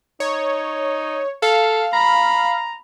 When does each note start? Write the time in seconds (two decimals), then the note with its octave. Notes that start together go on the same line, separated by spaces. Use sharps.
0.20 D#4 C#5
1.42 A4 F5
1.93 A#5 B5